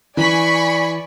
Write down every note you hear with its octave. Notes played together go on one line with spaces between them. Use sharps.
E3 D5 G#5 B5 C#6